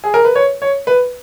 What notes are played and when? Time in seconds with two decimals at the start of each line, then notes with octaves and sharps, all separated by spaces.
0.04 G#4
0.14 A#4
0.25 B4
0.35 C#5
0.62 C#5
0.87 B4